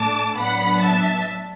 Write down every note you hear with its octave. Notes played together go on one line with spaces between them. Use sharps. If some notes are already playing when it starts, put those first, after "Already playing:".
Already playing: A2 A3 D4 A5 D6
A2 F#3 B3 D4 F#5 B5
E5 A5